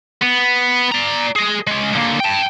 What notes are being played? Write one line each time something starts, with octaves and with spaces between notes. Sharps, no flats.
B3
D5 A#5
G#4 D#5
G#3 C#4
D3 A#3
G5 A5